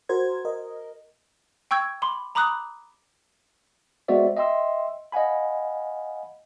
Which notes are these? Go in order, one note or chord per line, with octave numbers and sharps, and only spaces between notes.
F#4 A#4 C5 G#6
A#4 D#5
G5 C#6 E6 G6 G#6
B5 C6 D6
A#5 B5 D6 D#6 F#6
G#3 B3 F#4 C5 D5 E5
D#5 E5 G5 C6 E6
D#5 F5 F#5 G#5 B5